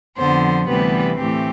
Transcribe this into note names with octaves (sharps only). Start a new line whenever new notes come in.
F2 D3 F3 B3 C5
D2 C3 E3 G3 B3 B4
A2 E3 A3 C4 G4